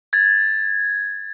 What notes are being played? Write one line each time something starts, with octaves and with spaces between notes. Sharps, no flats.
G#6 A6